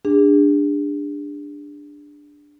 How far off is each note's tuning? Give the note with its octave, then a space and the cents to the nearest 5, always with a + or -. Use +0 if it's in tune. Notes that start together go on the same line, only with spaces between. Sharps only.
D4 +0 G#4 -40